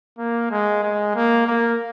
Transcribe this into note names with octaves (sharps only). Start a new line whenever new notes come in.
A#3
G#3
G#3
A#3
A#3